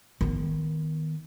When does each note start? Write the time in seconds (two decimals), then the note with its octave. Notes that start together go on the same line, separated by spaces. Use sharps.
0.21 D#3 B3